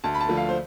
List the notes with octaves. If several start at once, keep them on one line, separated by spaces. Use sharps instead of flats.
D2 A5
B5
A5
D3 F3 A3
F5
C5